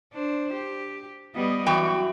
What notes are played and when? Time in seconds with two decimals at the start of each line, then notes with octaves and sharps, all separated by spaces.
0.14 D4 C5
0.54 G4
1.35 G3 B3 D#5
1.66 F#2 E3 F#4 G5